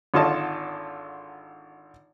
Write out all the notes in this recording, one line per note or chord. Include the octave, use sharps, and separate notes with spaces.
G#1 D3 F4 C#5 D#5 A5